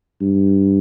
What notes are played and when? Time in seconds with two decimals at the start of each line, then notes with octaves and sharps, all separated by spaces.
0.21 G2